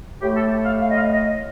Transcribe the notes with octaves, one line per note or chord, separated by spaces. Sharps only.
A2 A3 G4
A4
F5
F5
D#5
F5
D#5